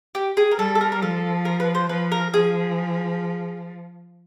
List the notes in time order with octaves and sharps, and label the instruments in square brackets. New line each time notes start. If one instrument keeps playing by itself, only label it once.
[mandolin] G4
G#4
A#4
[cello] G3 [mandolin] A4
[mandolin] A4
A#4
A#4
[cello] F3 [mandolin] A4
[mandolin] A#4
B4
C5
[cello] F3 [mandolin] B4
[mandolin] A#4
[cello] F3 [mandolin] G#4